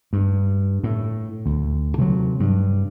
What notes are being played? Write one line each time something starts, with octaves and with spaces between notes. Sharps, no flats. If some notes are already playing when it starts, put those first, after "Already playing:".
G2
A2
D2
C3 E3 F#3
G2